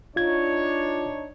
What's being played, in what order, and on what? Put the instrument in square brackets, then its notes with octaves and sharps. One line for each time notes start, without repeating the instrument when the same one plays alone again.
[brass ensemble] D4 D#4 C#5 [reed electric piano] F4 G#6